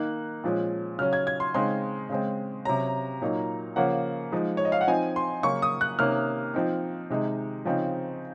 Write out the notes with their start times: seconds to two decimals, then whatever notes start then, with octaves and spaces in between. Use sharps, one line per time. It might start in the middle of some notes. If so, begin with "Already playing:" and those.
Already playing: D#3 A#3 D#4 F#6
0.44 A#2 F3 G#3 C#4
0.99 C#3 F#3 C#4 F6
1.13 G#6
1.27 G#6
1.40 C6
1.54 C#3 G#3 C4 D#4 C6
2.09 C#3 G#3 C4
2.65 C3 F#3 C#4 A#5
3.22 A#2 F#3 A#3 D#4
3.76 C#3 F3 A#3 C#4 F#5
4.32 F3 G#3 D#4
4.57 C#5
4.65 D#5
4.72 F5
4.81 F#5
4.87 F3 C4 D#4 G#5
5.16 C6
5.43 C#3 F#3 A#3 C#6
5.62 D#6
5.81 F#6
5.99 C3 D#3 A#3 C#4 F6
6.54 F3 C4 D#4
7.10 C3 D#3 G#3 D#4
7.65 C#3 F3 C4 D#4